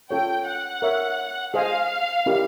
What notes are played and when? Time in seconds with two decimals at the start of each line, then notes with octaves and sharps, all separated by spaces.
0.10 C#4 F4 A4 C#5 G5
0.47 F#5
0.82 A#4 C#5 E5
1.54 G#4 C5 D#5 F5 G#5
2.26 C#4 E4 G4 A#4 D#5